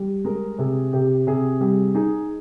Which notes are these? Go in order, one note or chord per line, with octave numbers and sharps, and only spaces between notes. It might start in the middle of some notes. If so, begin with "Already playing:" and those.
Already playing: G3
G#3 A#4
C3 G#4
C3 G4
C3 G#4
G3 G#4
D#4 G#4